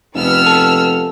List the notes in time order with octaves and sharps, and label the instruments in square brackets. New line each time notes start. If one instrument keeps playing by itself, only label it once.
[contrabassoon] F1 [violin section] B3 E6 F6
[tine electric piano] A4